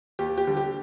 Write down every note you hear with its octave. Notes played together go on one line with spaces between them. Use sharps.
D#2 G4
G4
D3 G3
G4